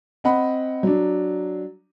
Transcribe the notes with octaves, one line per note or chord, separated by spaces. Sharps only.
C4 D#5 F#5 B5
F#3 D4